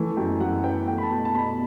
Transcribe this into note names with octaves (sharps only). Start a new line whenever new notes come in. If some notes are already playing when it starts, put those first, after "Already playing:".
Already playing: E3 A3
F#2 G5
F#2 F#5
B3 G5
A3 G5
B5
A5
B2
A5
B2 B5